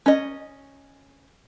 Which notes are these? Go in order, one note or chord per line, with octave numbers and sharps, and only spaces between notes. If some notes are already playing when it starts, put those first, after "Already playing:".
C#4 D#5